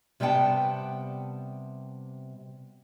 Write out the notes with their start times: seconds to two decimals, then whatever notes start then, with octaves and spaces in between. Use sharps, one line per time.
0.20 C3 G3 B3 F#5 G5 A5